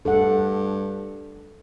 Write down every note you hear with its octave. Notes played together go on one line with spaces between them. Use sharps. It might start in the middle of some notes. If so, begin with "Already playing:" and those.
G2 A4 F#5